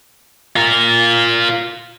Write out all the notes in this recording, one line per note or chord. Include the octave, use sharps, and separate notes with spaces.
F4 A#4